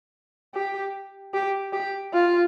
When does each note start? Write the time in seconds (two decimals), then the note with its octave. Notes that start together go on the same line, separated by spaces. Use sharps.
0.54 G4
1.34 G4
1.72 G4
2.13 F4